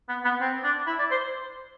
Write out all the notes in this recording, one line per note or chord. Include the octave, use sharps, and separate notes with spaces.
B3
B3
C4
D4
E4
D5
C5